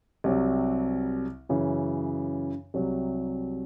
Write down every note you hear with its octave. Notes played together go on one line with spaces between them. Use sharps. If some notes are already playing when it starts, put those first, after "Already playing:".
C2 C3 F#3
F#2 C#3 E3
C2 C3 F#3